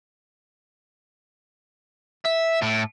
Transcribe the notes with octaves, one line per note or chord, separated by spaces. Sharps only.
E5
A2